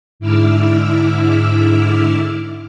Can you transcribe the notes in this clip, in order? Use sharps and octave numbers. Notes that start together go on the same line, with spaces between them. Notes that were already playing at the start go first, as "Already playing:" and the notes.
G#2 D3 E4 D6 E6 F6